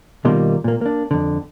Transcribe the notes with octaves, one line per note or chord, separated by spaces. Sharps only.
B2 D#3 G3 A#3 F4 C6
A#2 A#3
A#3 D4
F2 D3